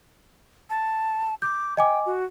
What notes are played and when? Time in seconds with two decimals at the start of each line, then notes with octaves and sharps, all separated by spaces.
0.70 A5
1.42 D6 G6
1.77 D#5 G5 G#5 D6
2.06 F#4